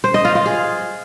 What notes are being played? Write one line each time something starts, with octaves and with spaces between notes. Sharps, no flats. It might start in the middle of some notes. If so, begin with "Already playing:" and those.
C5
D#5
F4
F4
G#4